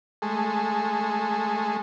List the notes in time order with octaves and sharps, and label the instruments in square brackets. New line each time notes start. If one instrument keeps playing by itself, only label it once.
[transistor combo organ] G#3 A3